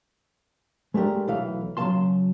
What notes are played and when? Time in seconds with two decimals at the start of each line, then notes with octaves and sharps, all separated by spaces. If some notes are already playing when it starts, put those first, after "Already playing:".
0.94 G#3 A3 D4 G4 A#4
1.27 B1 E3 A3 F5
1.77 C#3 F#3 F4 F5 A5 C6